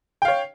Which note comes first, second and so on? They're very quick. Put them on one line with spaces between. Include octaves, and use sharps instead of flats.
G5 F5 C#5